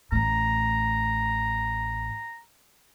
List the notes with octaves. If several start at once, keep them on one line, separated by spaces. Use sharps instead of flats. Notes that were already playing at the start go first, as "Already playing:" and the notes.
A1 A2 A#5